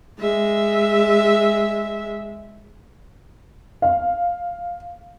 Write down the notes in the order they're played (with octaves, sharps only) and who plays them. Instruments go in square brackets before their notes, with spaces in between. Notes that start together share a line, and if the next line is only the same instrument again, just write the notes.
[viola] G#3 E5
[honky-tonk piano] F5